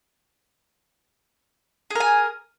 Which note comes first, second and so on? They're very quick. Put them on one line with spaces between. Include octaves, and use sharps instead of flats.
G#4 A#4 G#5